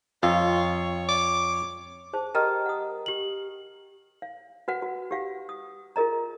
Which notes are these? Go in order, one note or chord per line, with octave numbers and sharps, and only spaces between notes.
F2 F4 C#5
D6
G#4 C5 A5
G4 A#4 D#5 G5 A#5 F6
F#5 D#6
G4 F#7
F5
F#4 B4 F#5
F#4
G4 F5 F#5
D#6
F4 G#4 A#4 D#5 A#5